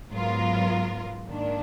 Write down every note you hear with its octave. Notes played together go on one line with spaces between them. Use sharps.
G#2 F#3 B3 F4 A#4
G#2 D#3 A#3 D4